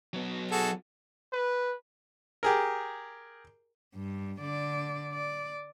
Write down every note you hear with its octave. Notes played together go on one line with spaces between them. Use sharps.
F#3 B3
F#4 G#4 A4
B4
G4 G#4 A#4
G2
D3 D5
D5